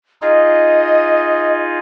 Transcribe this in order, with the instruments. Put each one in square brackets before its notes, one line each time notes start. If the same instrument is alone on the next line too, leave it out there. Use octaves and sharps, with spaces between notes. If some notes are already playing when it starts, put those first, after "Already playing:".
[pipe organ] D#4 F4 G#4 [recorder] D#5